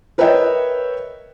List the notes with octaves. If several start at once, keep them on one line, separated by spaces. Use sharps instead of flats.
A#4 B4 C#5 D#5 E5 G5